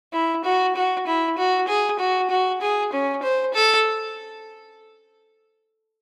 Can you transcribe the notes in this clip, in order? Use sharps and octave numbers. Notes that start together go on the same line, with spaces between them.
E4
F#4
F#4
E4
F#4
G#4
F#4
F#4
G#4
C#4
C5
A4